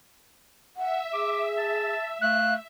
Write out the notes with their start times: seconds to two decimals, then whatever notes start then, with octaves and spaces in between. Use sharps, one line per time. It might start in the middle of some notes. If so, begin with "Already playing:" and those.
0.77 E5 F#5
1.13 G#4 D6
1.57 A5
2.21 A3 F5 F#6